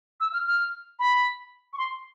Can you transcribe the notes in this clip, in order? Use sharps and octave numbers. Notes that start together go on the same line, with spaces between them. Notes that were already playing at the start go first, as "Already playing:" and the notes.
E6
F6
F6
B5
C#6
C6